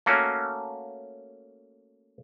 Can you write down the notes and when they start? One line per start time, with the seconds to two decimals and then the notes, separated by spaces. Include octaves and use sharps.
0.06 A3 A#3 C#4 F#4